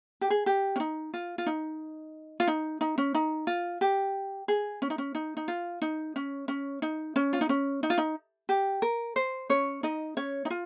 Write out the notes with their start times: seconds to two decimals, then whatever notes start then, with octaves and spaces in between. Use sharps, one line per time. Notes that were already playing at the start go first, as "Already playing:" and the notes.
0.21 G4
0.30 G#4
0.46 G4
0.76 C#4
0.80 D#4
1.14 F4
1.38 F4
1.46 D#4
2.40 F4
2.48 D#4
2.81 D#4
2.98 C#4
3.15 D#4
3.47 F4
3.81 G4
4.48 G#4
4.82 C#4
4.90 D#4
4.98 C#4
5.15 D#4
5.37 D#4
5.48 F4
5.82 D#4
6.16 C#4
6.48 C#4
6.82 D#4
7.16 C#4
7.33 F4
7.41 D#4
7.49 C#4
7.83 D#4
7.90 F4
7.98 D#4
8.49 G4
8.82 A#4
9.16 C5
9.50 C#4 C#5
9.83 D#4 D#5
10.17 C#4 C#5
10.45 D#4
10.50 F4